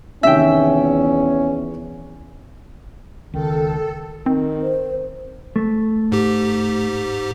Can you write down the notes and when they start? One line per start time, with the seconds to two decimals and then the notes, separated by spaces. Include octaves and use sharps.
0.23 E2 C3 D#3 C#4 E5 G5
3.34 C#2 D#3 A4
4.26 D#3 C4
4.62 C5
5.56 A3
6.12 G#2 G4